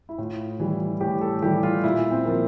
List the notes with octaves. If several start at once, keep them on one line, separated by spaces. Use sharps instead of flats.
E4
A2 F4
E3 G3
A2 G4
A4
E3 G3 G4
F4
A#2 E4
C4
F3 A#3